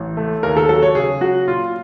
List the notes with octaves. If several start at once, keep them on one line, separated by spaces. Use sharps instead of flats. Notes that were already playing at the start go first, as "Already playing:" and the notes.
Already playing: A1
A3
D#2 A#4
A4
F#3 A4
C#5
C#3 G#4
F#3 F#4
A#2 F4